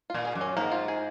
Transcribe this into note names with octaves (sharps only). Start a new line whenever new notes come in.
A#2 F4
G#4
F#2
C#4
G#2 A#3
F4
G#4